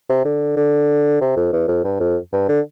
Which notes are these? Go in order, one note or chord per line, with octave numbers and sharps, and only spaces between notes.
C3
D3
D3
C3
F2
E2
F2
G2
F2
G2
D3